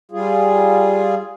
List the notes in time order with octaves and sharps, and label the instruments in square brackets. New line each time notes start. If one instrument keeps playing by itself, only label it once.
[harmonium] G3 F4 G#4